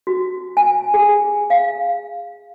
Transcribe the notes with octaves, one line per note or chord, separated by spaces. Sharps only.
F#4
G#5
G#4
F5